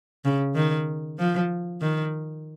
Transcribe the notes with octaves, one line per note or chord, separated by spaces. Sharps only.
C#3
D#3
F3
D#3